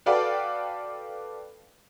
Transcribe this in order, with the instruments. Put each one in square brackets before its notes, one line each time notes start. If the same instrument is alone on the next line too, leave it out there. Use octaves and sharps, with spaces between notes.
[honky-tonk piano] F#4 A4 B4 D5 F5 G5